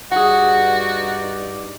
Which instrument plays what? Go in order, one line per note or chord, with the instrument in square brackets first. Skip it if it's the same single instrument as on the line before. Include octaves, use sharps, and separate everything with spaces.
[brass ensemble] G2 D#4 D5 [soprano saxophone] F#4 [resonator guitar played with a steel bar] G#4 F#5